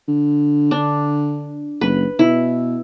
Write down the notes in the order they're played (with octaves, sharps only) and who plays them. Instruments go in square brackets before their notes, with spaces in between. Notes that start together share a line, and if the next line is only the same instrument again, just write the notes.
[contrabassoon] D3
[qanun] D4
[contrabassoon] F#1 [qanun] B4
[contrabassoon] B2 [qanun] E4